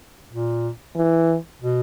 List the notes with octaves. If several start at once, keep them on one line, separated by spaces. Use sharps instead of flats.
A#2
E3
B2